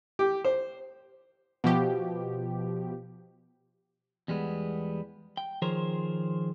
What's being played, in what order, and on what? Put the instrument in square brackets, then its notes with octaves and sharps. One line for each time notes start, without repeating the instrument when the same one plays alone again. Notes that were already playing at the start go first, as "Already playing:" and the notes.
[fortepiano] G4
C5
[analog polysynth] B2 F3 G4
[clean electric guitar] E2 G3 G#3 B3
G5
D#3 F3 G#4 A#4 C5 C#5